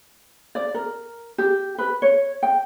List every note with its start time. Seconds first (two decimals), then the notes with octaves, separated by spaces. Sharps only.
0.55 D5
0.74 A#4
1.38 G4
1.78 B4
2.02 C#5
2.43 G5